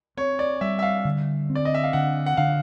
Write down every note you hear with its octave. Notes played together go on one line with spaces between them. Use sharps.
C4 C#5
D5
G3 E5
E5
F5
D3
C4
D5
D#5
E5
F5
D3 F#5
F#5
D3 F5